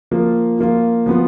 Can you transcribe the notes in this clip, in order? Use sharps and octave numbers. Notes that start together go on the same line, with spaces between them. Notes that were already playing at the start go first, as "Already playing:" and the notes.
F3 A#3 F4
F3 A#3 F4
F3 B3 F4